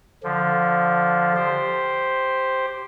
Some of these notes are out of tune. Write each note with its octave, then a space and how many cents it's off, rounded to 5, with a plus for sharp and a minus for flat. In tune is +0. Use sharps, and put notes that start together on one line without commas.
D3 +0 F3 +0
G4 +0 C5 +0